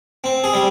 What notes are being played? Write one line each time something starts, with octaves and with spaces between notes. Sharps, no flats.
C4
G#4
G3